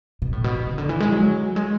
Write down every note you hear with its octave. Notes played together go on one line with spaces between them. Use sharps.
B2
A2
B2
E2
C#3
D3
E3
G#3
F#3
G#3